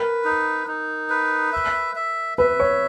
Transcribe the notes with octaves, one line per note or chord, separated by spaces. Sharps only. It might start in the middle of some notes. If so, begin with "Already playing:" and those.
Already playing: A#4 B4
D#4
D#4
B4
E5
E5
B4 E5
C#5